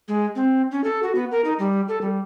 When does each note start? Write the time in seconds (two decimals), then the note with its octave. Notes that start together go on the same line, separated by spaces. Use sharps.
0.08 G#3
0.36 C4
0.71 C#4
0.84 A4
1.03 F#4
1.15 B3
1.31 A#4
1.45 D#4
1.59 G3
1.88 A4
2.01 G3